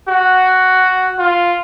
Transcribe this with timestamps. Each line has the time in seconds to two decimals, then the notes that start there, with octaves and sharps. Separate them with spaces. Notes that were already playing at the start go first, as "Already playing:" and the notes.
0.09 F#4
1.19 F4